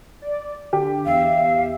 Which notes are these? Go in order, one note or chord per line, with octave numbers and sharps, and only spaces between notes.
D5
D3 G4
E2 E5 F5